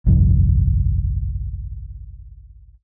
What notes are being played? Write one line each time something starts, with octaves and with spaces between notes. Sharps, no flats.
G1 C2 F2